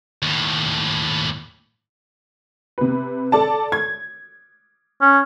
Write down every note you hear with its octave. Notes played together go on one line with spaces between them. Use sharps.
D#2 A2
C3 B4
A4 D5 A5
G#6
C#4